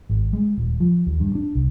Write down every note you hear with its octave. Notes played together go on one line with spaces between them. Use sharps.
G#1
G#3
D#1
F3
D#2
G2
D4
C2